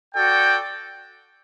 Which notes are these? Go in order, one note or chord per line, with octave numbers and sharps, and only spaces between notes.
F#4 A4 D5 G5